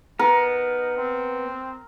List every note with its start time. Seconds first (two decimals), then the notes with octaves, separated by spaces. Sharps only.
0.19 B3 D#4 A#4
0.97 C4